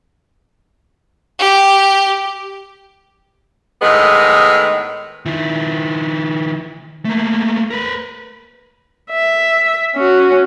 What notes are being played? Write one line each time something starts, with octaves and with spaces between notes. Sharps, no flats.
G4
A2 D#3 G#3 B3
D#3 E4
A3 A#3
A#4 B4
E5
C#4 F#4